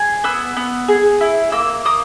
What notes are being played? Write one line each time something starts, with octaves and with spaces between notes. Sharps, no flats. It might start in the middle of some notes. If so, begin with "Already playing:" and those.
Already playing: G#4
B3 E6
B3
G#4
E4
A#3 E6
A#3 D#6